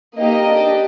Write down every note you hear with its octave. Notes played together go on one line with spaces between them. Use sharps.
A#3 D#4 G4 D#5
D4
G4